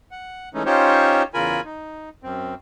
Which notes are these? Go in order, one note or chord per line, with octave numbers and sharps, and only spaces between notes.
F#5
E3 G#3 A3 C#4 D#4
C#4 D#4 F4 G4 C5 C#5
E2 C#3 F4 A#4 G#5 B5
D#4
F#2 C4